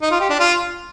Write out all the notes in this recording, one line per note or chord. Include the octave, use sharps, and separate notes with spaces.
D#4
F4
G4
D4
F4